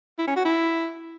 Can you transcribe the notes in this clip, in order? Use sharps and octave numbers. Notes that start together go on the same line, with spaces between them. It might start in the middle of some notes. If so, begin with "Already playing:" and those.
E4
C#4
F#4
E4